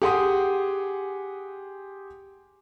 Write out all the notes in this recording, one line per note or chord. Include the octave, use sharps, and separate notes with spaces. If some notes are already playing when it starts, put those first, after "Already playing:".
G4 G#4 F#5 G#5 C6 D#6